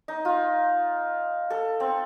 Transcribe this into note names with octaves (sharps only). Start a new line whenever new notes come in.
D#4
F4
A4
C4